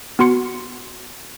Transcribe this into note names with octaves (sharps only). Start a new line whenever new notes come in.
B3 F#4 C6 C#7